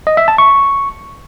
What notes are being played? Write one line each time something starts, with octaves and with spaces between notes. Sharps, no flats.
D#5
E5
A5
C#6